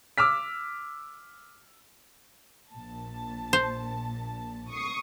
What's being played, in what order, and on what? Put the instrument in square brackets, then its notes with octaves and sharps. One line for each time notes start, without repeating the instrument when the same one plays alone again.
[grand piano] D6 E6 F6 B6
[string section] A#1 A#2 A5
[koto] C5
[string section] C#6 D#6 C7